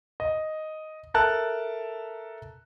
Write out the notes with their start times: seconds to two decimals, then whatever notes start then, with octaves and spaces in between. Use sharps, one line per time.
0.20 D#5
1.14 A4 A#4 E5 A5 F#6